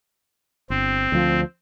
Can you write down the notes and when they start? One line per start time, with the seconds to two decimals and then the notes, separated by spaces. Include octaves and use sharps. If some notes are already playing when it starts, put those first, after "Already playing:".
0.70 G1 C4
1.12 D2 F3